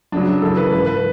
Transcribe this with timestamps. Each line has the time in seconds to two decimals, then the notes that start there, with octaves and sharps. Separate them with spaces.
0.12 F#2 C#3 F#3 D4
0.42 F#2 C#3 E3 A4
0.57 B4
0.71 G#2 E3 B4
0.86 B4